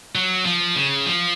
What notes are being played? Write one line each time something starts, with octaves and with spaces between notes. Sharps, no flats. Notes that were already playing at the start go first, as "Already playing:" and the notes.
F#3
F3
C#3
F3